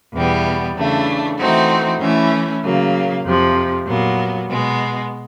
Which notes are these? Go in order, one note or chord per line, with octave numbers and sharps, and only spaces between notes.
E2 B2 G3 B3
C#3 E3 A3 D4
E3 A3 C4 D#4 F#4
E3 A3 C#4 E4
C#3 F#3 A#3
F2 C3 F3
A#2 F#3 B3
B2 G#3 B3